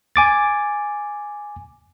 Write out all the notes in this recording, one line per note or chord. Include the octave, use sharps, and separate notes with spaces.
G#5 D6 A6